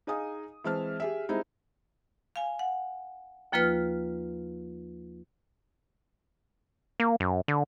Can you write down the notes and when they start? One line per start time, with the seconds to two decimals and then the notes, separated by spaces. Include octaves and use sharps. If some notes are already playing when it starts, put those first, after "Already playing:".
0.07 D#4 G#4 D#5 F5 G#5 D#6
0.64 E3 G#3 C4 E5 A5 F6
1.00 G4 G#4 E5
1.29 G3 G#3 C4 D#4 E4
2.36 F5 G#5
2.59 F#5
3.52 D#2 F3 A#3 F4 B4 F6
7.00 A#3
7.20 F#2
7.48 D3